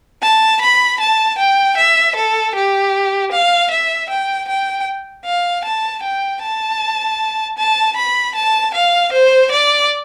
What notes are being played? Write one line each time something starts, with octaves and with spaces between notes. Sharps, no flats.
A5
B5
A5
G5
E5
A4
G4
F5
E5
G5
G5
F5
A5
G5
A5
A5
B5
A5
F5
C5
D5